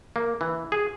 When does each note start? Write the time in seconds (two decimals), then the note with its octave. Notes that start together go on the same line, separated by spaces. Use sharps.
0.16 A#3
0.41 E3
0.72 G#4